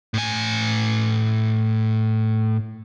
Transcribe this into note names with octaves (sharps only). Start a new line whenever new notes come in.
A2 G#5